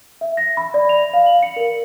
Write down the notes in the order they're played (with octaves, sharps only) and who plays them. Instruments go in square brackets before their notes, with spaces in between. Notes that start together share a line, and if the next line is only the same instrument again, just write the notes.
[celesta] E5
A#6
B5
D5
F7
F5
F#7
C#7
A#4